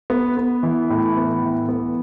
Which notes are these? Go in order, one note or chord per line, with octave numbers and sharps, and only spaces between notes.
B3
B3
E3
A2
B3
E3
B3